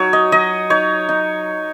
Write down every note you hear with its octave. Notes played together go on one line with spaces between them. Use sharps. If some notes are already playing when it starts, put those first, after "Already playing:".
Already playing: F#3 D#4 C#5
D#5
F#3 D#5
D#4 C#5
D#4